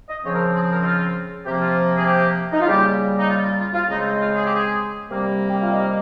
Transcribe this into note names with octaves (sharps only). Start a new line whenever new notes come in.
D#5
C#3 F3 C4 C#5
A#4
C5
G#4
A#4
D#4
F4
C3 F3 A#3 G4
F4
G#4
G4
D#4
F4
C#3 G3 A#3 G4
D#4
F4
F4
F4
F4
C#3 G#3 C4 D#4
F4
G#4
G4
G#4
C3 G3 A#3
G4
F4
D#4